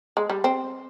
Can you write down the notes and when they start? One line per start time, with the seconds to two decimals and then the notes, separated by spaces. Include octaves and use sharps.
0.17 G#3
0.30 G3
0.44 C4